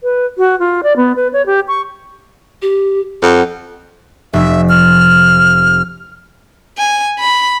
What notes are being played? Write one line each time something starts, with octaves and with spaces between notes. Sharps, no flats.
B4
F#4
F4
D5
B3
B4
C#5
G4
C#6
G4
F2 F#5
F1 E5
F6
G#5
B5